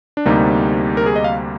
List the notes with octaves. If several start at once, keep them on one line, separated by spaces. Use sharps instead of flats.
D4
D2 C3 G3 A#3 D#4
A#4
G#4
D#5
F5